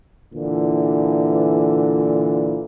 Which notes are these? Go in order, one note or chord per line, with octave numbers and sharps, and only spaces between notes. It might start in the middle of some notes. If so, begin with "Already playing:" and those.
A#2 D3 E3